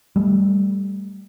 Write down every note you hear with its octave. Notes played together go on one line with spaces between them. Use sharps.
G3 A3